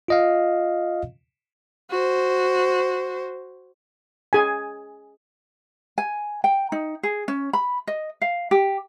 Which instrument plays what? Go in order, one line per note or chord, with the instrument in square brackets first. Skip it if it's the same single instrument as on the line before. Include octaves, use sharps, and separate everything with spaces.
[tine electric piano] F4 D#5 F5
[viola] F#4 C5
[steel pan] G#4 G#5
[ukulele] G#5
G5
D#4
G#4
C#4
B5
D#5
F5
G4